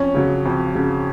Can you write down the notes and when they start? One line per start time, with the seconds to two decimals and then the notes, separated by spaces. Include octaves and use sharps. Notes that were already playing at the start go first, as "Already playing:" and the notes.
Already playing: F2 C#4
0.14 C#3 F#3
0.46 F2
0.75 C#3 F#3